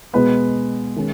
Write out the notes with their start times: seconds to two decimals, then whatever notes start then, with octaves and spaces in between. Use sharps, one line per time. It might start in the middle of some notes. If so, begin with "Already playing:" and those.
0.13 B2 G#3 B3 B4
0.96 D#3 G#3 C#4